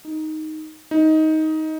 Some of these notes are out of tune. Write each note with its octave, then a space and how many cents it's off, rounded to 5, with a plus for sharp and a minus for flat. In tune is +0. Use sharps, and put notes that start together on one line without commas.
D#4 +5
D#4 +15